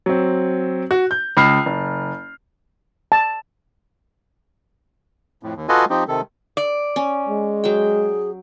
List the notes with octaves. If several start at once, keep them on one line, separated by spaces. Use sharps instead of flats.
F#3 C4
F#4
G6
C#2 B5 F6 C7
F#1
A5
F2 A2
D#2
F4 F#4 A4 B4 D#5 G#5
F3 C4 D#4 G4
C3 D#3 A4
D5
C#4
G#3
F#3 G#4 G5